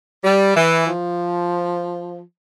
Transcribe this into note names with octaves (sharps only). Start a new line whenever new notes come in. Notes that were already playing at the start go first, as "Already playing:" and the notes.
G3
E3
F3